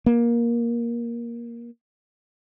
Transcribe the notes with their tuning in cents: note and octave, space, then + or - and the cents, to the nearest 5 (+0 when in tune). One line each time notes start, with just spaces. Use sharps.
A#3 +15